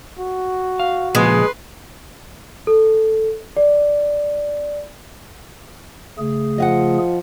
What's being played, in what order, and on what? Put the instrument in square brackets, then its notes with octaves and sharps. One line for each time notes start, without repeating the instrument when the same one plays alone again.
[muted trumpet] F#4
[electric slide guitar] F5
[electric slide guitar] A#2 C#3 F3 [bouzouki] G#3 [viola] B4 C6
[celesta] A4
D5
[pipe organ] C#3 A3 G#4
[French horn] F3 [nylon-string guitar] D#5 F5 F#5